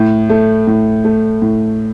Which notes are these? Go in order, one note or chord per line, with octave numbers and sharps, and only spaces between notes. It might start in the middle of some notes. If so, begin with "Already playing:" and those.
Already playing: A2
A3
A2
A3
A2